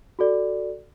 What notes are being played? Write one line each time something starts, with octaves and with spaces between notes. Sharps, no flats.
F#4 A4 D5